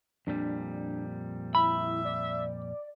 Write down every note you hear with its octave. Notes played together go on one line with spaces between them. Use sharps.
F2 A#2 G3 D4
E4 E5 B5
D5